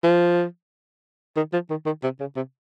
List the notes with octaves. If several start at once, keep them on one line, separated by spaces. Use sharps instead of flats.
F3
D#3
F3
D#3
D#3
C3
C#3
C3